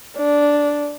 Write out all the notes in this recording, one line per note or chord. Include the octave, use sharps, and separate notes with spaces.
D4